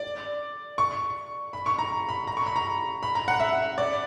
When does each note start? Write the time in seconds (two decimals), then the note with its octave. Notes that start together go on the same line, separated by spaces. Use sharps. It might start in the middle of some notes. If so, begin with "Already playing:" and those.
Already playing: D5
0.78 C#6
1.53 B5
1.66 C#6
1.79 A#5
2.09 B5
2.27 A#5
2.37 C#6
2.46 B5
2.56 A#5
3.03 B5
3.15 A#5
3.28 F#5
3.40 E5
3.78 D5